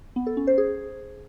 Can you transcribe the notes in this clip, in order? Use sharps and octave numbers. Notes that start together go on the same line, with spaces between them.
B3
A4
C#4
C5
G#4